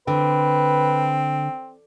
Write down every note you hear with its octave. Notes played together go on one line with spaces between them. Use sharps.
D3 C4 B4